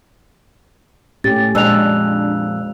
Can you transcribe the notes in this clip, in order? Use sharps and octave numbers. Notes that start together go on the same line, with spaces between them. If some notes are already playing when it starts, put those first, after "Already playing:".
A2 C#4 G4 A6
F2 A#2 G#3 D4 E6 F#6 F7